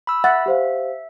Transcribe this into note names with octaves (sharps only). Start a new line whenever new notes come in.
B5 E6
E5 F#5 A6
G4 C5 F5